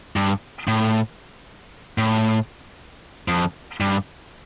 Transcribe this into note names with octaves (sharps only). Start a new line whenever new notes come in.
G2
A2
A2
F2
G2